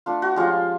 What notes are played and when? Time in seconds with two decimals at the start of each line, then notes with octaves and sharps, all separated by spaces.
0.06 A3 D4 F4
0.22 F#4
0.36 F3 G#3 C#4 F4 G4